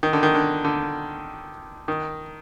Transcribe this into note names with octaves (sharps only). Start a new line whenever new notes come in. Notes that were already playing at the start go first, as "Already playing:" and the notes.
D#3
D3
D#3
D3
D3
D#3